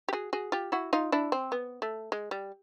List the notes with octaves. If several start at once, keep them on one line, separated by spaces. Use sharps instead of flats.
G4
F#4 G#4
F#4 G#4
F4 G4
E4 F#4
D#4 F4
D4 E4
C4
B3
A3
G#3
G3